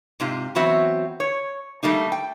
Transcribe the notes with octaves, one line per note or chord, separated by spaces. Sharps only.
G#2 C3 F4
E3 F#3 B3 C4 F#4 E5
C#5
G3 A3 A#3 D#4
G5